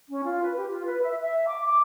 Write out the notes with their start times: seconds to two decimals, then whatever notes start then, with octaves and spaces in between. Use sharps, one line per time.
0.09 C#4
0.24 F4
0.43 B4
0.57 G4
0.70 F4
0.86 B4
1.03 E5
1.22 E5
1.48 D6
1.64 D6